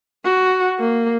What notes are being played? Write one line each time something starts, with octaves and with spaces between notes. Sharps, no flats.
F#4
A#3